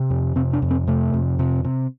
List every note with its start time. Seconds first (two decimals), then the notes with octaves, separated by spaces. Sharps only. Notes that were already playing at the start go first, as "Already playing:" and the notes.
Already playing: C3
0.10 F2
0.36 C3 C4
0.53 D4
0.62 F2
0.71 C4
0.87 C3 A3
1.14 F2
1.39 C3
1.65 C3